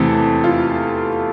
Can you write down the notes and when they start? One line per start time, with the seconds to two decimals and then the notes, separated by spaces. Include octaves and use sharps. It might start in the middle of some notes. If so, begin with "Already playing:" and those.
Already playing: E2 C3 E3 A3 C4 A4
0.44 F4